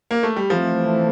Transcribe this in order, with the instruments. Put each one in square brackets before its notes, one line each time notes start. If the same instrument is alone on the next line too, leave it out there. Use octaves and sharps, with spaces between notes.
[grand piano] A#3
A3
G3
[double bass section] E3 A3 C4 [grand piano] F3